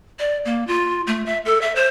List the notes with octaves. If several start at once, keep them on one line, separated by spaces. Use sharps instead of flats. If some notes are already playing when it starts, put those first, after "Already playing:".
D5
A#3
F4
A3
E5
A4
E5
C5